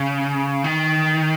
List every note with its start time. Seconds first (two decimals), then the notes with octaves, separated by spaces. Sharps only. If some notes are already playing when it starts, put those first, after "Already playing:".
Already playing: C#3
0.64 D#3